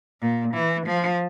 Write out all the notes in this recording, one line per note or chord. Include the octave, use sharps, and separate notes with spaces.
A#2
E3
F3